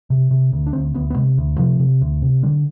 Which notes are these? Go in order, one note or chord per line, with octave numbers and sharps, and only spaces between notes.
C3
C3
D2
D4
D2 C4
D2 B3
B3
C3 G#3
D2
C3 F3
C3
D2
C3
D3 G3